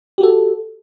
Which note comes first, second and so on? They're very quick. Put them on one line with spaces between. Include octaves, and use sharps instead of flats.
G4 F#4 A4